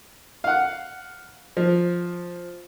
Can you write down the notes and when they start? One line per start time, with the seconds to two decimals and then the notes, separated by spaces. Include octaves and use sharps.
0.44 F5 F#5
1.57 F3